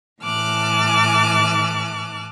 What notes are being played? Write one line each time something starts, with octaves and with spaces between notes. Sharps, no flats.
A2 E3 A5 D6 F6 F#6